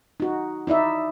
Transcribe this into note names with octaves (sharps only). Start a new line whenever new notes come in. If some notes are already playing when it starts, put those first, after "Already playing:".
D#4 F#4
D#4 E4 D5 E5